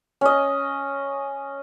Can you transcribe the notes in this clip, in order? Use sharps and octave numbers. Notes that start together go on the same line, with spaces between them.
C#4 D#5